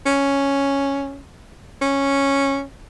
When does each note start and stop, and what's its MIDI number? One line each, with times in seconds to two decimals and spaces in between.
0.06 1.20 61
1.81 2.63 61